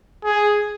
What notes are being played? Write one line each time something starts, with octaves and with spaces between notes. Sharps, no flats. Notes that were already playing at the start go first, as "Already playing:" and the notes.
G#4